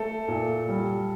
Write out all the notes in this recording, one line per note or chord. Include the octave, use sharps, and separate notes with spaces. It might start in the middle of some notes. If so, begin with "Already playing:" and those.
Already playing: A3 A4
A#2
G3